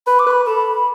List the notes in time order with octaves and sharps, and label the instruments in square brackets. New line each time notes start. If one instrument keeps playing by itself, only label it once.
[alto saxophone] B4 [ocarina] B5
[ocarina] D6
[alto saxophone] B4 [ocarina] B5
[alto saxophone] A4 [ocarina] B5